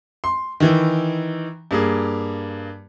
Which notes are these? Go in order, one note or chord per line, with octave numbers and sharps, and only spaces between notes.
C6
D#3 E3
G2 A#3 G#4